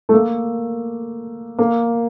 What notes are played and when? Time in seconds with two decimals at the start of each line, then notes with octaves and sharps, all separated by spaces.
0.09 A3
0.13 A#3
1.58 A#3